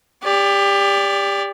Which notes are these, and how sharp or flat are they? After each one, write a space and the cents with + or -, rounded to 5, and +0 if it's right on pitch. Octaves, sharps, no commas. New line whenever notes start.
G4 +25 D5 -20